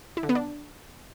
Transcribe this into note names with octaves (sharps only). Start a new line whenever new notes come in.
E4
D3
B3
D4